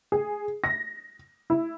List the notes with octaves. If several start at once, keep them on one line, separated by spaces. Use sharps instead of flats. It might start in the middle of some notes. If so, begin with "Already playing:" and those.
G#4
A#6
E4